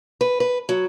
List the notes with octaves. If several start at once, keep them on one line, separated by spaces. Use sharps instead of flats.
B4
B4
F#3